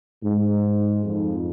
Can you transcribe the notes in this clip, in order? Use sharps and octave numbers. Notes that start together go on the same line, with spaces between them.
G#2
F2